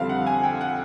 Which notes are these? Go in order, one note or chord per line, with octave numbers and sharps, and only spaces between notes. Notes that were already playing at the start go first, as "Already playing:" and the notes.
Already playing: F2 D3 G3 C4 F5
F#5
G#5
G5
F#5